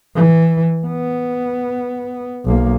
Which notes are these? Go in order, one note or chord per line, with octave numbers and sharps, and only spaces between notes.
E3
B3
B1 A#3